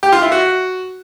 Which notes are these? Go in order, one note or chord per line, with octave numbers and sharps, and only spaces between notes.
G4
F4
E4
F#4